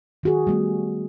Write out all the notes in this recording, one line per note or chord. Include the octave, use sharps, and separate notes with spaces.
D#3 F#4 G#4
G3 A3 B3